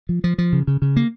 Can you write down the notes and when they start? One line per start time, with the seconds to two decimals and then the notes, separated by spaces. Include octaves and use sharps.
0.09 F3
0.24 F3
0.38 F3
0.53 C#3
0.67 C#3
0.82 C#3
0.96 A#3